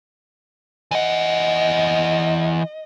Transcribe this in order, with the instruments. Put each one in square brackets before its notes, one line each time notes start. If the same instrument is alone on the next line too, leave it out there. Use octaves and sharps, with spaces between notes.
[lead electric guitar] E3 F#5 [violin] D#5